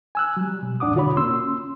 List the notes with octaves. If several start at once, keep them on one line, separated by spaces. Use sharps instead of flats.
G#5 E6 F#6
F#3 G3
B2
E2 A2 D4 F#5 D6 D#6
B2 D3 F4 F#4 C#5 B5
A#3 C#4 C6 E6